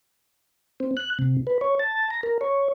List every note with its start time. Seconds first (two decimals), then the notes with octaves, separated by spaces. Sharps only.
0.80 C4
0.97 F#6
1.19 C3
1.47 B4
1.61 C#5
1.80 A5
2.10 A#5
2.23 A#4
2.41 C#5